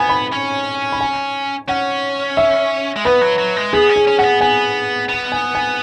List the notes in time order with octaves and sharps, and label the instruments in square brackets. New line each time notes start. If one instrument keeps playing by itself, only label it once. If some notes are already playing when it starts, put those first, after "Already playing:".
Already playing: [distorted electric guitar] B3 [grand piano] G#5
[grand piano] B5
[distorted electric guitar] C#4
[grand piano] B5
G#5
[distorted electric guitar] C#4 [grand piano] F#5
[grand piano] E5
[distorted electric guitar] G#3
[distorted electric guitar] B3 [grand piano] B4
[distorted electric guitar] F#3
F#3
G#3
[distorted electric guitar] B3 [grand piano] G#4
[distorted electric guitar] C#4
[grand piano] G#4
[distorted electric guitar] C#4
[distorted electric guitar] C#4 [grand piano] F#5
[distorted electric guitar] B3
[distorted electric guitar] B3 [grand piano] G#5
[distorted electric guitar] B3
[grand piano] G#5
G#5